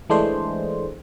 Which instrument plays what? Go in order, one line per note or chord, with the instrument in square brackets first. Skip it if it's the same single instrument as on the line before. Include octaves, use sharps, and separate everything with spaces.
[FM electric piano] E3 G#3 A3 D4 G#4 C5